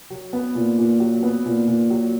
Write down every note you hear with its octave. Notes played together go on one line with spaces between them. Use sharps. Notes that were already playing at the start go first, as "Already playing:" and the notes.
F#3
B3
A#2
A#2
F#3
B3
A#2
A#2
F#3